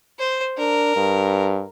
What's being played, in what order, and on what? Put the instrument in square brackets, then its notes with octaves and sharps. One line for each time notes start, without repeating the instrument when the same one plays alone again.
[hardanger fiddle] C5
[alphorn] D4 [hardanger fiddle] A#4
[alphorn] G2